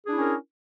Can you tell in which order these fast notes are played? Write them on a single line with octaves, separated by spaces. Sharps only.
G#4 D4 E4 C#4 A#4